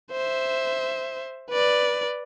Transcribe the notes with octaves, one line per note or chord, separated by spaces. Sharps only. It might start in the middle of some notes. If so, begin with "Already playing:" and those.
C5 E5
B4 D5